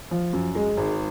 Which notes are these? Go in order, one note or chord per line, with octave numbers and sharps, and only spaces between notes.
F3
F#2
G#3
G#1